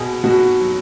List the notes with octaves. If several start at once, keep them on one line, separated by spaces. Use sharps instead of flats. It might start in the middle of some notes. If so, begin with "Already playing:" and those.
Already playing: B2 G#4
B2 F#4
F#3